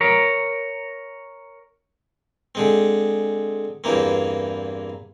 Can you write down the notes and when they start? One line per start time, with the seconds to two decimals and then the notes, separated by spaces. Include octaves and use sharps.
0.01 A#4 C#5
2.55 D3 G#3 C4
3.84 E2 G2 E3 A#3 C4